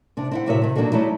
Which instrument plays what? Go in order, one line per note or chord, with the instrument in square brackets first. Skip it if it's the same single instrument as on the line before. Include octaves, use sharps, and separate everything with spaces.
[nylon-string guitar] C3 D4
C4 E4 F#5
A2 C3 F#3 A#4 D#5 E5
C3 D#3
B2 F#3 A#3 D4 F#4 A4
F#3 G3 A3 D#4 E4